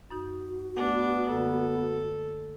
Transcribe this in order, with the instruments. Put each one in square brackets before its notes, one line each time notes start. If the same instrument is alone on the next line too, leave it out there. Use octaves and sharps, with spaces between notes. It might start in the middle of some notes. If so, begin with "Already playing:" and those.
[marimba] F#2 D#4 G6 [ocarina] F#4
[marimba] A3 F#5 [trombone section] B3 [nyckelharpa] D4
[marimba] F#2 D3 A#3 [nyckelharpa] A4